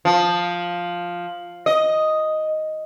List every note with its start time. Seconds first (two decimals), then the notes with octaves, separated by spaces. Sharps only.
0.05 F3
1.66 D#5